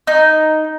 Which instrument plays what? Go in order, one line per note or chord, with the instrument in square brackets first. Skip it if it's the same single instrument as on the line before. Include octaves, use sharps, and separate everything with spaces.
[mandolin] D#4